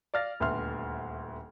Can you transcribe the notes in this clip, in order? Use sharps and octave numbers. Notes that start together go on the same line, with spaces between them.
D5 F5 F6 A6 A#6
D#1 D2 B3 E5 C6 F6